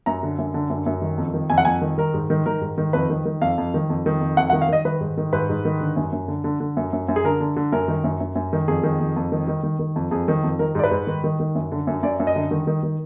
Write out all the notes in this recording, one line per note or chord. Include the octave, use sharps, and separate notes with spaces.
F#2 A#5
D3
F#2
D3
F#2
F#2
D#3
F2
D#3
F2 G#5
F#5
F2 G#5
D#3
D#3 A#4
G#2
D#3
D#3 A#4
G#2
D#3
F2 B4
D#3
D#3
F2 F5
F2
D#3
F2
D#3
F2
F2 F#5
F#5
D#3
F5
D#3 D#5
D#3 B4
G#2
D#3
G#2 B4
G#2
D#3
D3
F#2
F#2
D3
D3
D3
F#2
F#2
F#2
G#4
D3 A#4
D3
D3
F#2 A#4
D#3
F#2
F#2
F#2
D#3
F2 G#4
D#3
F2
F2
D#3
D#3
D#3
D#3
F2
F2 G#4
D#3
F2
D#3 A#4
G#2 D5
B4
G#2
D#3
D#3
D#3
F#2
D3
F#2
F#2 D5
F#2
D#5
D3
D#3
D#3
D#3